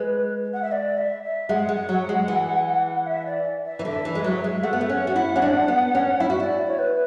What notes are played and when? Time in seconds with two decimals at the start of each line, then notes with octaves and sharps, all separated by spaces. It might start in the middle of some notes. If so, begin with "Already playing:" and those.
Already playing: G#3 B4
0.53 F#5
0.62 E5
0.72 D5
0.98 E5
1.23 E5
1.49 G#3 F#5
1.69 G#3
1.89 F#3
2.09 G#3
2.28 E3
3.06 E5
3.26 D5
3.66 E5
3.79 E3
3.85 D3 E5
4.05 E3
4.15 G#3
4.24 F#3 E5
4.44 G#3
4.63 A3 F#5
4.73 B3
4.81 A3
4.90 C#4
5.07 F#4
5.16 E4
5.36 C#4
5.42 D4
5.68 B3
5.95 C#4
6.20 E4 E5
6.30 F#4
6.35 E5
6.39 E4 D5
6.67 C#5
6.79 B4